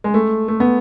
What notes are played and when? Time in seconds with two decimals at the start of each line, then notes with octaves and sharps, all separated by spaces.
0.04 G#3
0.14 A3
0.48 A3
0.60 B3